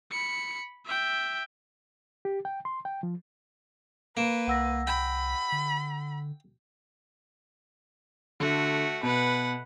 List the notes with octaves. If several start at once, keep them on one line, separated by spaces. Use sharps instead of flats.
B5 C#7
E5 G5
G4
G5
C6
G5
F3
A#3 B4 D7 E7
C2 F#5 E6 A#6
G5 B5
D3
D3 A3 F#4
B2 B4 F#5